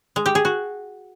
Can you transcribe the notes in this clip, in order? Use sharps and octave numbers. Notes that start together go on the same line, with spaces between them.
G#3
G4
G#4
F#4